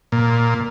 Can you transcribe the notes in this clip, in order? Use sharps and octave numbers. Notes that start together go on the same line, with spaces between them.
A#2